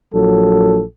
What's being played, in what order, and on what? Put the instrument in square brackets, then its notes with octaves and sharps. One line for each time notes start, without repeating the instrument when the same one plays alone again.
[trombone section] A#1 F#3 A4